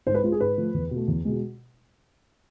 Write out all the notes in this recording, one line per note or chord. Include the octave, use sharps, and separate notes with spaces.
G#2 C5
B4
G#3 F4
G#4
G#2 B4
F3 A3
E2
B2 A3
E2
B2 G#3